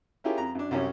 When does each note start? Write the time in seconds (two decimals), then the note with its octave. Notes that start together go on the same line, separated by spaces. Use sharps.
0.24 C#4 E4 F4 G4 G#4 A#4
0.38 F2 A#5
0.55 F#2 D4
0.71 C2 F#2 C#4 G4